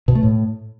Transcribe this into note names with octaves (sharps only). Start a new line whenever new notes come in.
B2
A3
A2